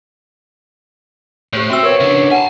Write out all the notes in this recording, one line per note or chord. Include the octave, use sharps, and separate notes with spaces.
A2 G4 C5 C#5
C4 F#4 C5 E5 E6
B3 G4 A#4 C#5
C#3 D4
F#5 G#5 A5